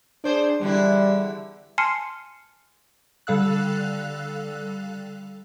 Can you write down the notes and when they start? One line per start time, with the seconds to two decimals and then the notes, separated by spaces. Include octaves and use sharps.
0.24 D4 G#4 C5 D5
0.61 E2 D3 G3 E4
1.78 G#5 A5 C6 F6 C7 C#7
3.27 D3 G3 A4 F5 E6 F#6